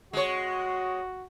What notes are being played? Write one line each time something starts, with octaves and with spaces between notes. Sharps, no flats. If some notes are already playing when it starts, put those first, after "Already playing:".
G#3 F#4 C#5